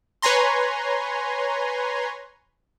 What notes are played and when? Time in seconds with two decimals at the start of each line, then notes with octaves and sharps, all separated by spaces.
0.22 B4 C#5 G#5 A#5 C6